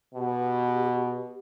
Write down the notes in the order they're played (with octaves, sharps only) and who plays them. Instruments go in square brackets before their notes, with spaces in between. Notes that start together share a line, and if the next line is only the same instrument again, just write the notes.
[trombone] B2 [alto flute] G4